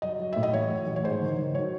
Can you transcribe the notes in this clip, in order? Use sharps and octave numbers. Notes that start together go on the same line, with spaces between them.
F#3 D#5
F#3
A2 E5
D#5
A1 C#5
F#3
A1
C#5
G#2 C5
D#3
D#3
F#3 C#5